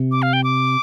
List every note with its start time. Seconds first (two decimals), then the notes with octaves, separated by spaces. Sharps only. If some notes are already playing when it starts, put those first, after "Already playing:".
Already playing: C3
0.11 D6
0.22 F5
0.33 G5
0.44 D6